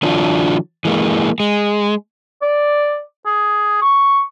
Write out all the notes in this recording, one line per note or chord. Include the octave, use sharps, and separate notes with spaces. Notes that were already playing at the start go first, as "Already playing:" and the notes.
D3 E3 F#3 D4 F4
E3 G#3 A#3
G#3
D5
G#4
C#6